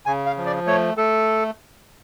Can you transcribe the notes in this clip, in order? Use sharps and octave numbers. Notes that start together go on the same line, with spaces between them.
C#3 G#5
F5
F3
D5
A3 C#5
A3 A4